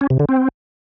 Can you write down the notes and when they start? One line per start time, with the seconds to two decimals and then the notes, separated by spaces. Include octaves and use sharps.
0.01 C#4
0.10 C3
0.19 D3
0.29 C4